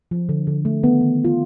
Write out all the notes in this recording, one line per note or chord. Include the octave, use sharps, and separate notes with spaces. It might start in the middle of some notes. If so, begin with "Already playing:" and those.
F3
D3
D3
A3
D#3 B3
D#3
D#3
F4